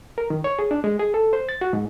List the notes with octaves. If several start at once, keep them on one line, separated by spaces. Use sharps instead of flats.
A#4
D#3
C#5
G#4
D4
G#3
G#4
A4
C5
A6
F#4
G#2